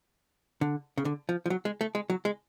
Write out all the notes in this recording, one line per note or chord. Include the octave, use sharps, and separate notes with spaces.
D3
C#3
D3
F3
F3
F#3
G#3
A3
G#3
F#3
G#3